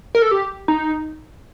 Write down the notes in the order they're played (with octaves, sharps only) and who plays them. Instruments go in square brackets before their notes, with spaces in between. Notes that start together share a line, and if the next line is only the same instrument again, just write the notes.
[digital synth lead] A#4
A4
G4
D#4